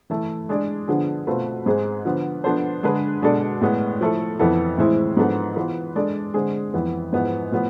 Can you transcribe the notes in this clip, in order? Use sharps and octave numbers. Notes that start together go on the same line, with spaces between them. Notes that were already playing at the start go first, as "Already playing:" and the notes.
E3 A3 E4
G#3 D4 G#4 D5
D3 F3 B3 D4 G#4
B2 A3 C4 F4 B4
G#2 G#3 C4 G#4
D3 F3 B3
F3 B3 D4 A4 C5
D3 G#3 D4 G#4 B4
B2 G#3 D4 A4 D5
A2 G#3 B3
F3 A3 E4 A4
F2 E3 B3 E4 A4
A2 E3 G#3 C4 E4
G#2 F3 B3 D4 A4
E3 B3 F4 B4
G#3 D4 A4 D5
D3 G#3 C4 G#4
F2 E3 B3 E4
G#2 F3 B3 E4
A2 F3 B3